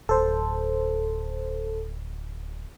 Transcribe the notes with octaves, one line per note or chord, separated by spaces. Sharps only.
D1 A4 C5